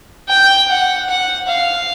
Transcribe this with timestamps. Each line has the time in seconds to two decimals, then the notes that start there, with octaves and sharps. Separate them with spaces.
0.29 G5
0.69 F#5
1.08 F#5
1.48 F5